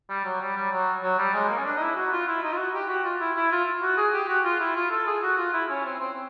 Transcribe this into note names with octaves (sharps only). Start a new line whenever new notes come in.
G3
F#3
G3
G3
F#3
F#3
G3
G#3
A#3
C#4
D4
D#4
E4
F#4
F4
E4
D#4
F4
F#4
G4
F#4
F4
E4
E4
F4
F#4
G#4
G4
F#4
F4
E4
F4
A4
G#4
F#4
F4
E4
C#4
C4
C4